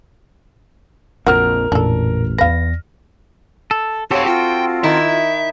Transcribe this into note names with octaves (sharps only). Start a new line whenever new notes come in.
A#1 F2 F#3 F#4 A#4 F6
A1 F2 A#2 D4 A4
E2 B4 F5 A#6
A4
C4 F#4 G4 A4 C#5 F5
F4 G5
D#3 D#4 E4 E5